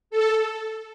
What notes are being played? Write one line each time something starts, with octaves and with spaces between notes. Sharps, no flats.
A4